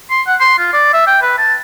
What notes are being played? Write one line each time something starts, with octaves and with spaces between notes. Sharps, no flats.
C6
F#5
C6
F4
D5
E5
G5
B4
A5